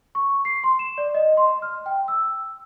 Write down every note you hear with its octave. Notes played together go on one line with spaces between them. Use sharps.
C#6
C7
C6
E7
D5
D#5
C6
F6
G5
E6